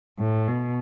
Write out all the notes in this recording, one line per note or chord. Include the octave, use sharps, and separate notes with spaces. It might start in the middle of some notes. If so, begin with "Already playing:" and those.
A2
B2